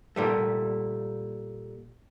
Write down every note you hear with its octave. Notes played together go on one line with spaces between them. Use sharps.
A#2 G3 A3